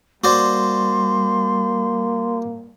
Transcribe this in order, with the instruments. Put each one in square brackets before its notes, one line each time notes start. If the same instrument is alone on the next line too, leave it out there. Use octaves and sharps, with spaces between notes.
[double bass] G3 [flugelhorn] A#3 [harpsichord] F#4 C5 D5 [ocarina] C6